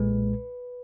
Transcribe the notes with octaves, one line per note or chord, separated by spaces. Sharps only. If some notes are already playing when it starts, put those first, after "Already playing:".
Already playing: B1 A#2 G#3 B4